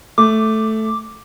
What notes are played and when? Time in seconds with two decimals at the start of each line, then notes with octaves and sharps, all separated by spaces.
0.18 A3 D6